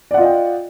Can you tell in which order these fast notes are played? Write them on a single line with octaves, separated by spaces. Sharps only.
D5 F#5 F4 D#5 G5